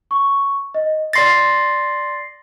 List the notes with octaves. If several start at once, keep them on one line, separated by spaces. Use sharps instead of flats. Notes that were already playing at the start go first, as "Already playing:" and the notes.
C#6
D#5
D5 C6 A6 A#6 C7